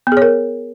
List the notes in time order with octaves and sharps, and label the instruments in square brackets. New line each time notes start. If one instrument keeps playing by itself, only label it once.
[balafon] B3
G#4
C#5
A#4